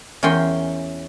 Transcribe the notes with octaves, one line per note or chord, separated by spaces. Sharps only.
E2 C#4 A#4 G5 C6